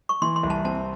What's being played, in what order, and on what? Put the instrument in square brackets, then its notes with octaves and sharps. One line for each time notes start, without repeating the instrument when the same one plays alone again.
[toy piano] C#6
[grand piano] E3 [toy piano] C6
[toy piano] C6
[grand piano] C2
[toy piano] A5
[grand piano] C4 [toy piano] A5